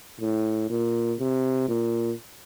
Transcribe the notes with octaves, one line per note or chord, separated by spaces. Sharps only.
A2
A#2
C3
A#2